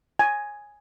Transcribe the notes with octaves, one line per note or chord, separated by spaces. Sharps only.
G#5